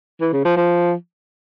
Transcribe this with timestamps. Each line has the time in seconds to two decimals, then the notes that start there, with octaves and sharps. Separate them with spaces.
0.21 E3
0.33 C#3
0.45 F3
0.57 F3